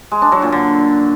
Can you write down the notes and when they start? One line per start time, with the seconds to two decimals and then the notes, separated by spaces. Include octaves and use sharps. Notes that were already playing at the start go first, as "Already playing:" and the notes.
0.12 G#3
0.22 D4
0.32 F#3
0.42 A#2
0.52 D3